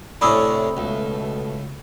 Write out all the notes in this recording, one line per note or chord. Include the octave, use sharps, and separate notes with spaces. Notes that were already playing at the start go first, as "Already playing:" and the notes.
A2 C3 C#4 D4 A4 B5 D#6 E6
C#2 B2 A3